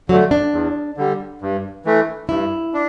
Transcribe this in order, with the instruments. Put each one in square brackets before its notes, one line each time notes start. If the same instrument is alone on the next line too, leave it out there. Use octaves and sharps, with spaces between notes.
[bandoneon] D3 [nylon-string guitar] F#3
[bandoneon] A3
[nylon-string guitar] D4
[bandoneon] E2
D3 G3
G2
E3 A3
[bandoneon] G2 [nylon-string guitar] E4
[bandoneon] D4